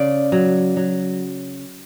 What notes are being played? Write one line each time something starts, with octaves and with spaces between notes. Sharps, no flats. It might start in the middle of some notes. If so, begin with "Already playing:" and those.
Already playing: C#3 D5
F#3
F#3